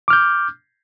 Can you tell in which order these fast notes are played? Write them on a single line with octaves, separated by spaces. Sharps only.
D6 F6 G6